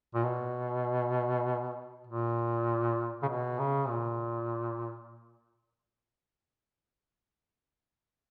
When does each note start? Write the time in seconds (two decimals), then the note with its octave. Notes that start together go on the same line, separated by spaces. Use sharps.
0.14 A#2
0.24 B2
2.07 A#2
3.22 C#3
3.28 B2
3.59 C#3
3.89 A#2